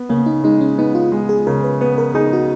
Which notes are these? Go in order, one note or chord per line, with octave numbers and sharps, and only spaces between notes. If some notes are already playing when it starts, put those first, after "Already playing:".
Already playing: B3
C#3 A#3
D#4
G#3 D#4
C#4
B3 D#4
F4
G#3
G#4
C#3 A#4
B4
B3 B4
A#4
D#4 G#4
F#4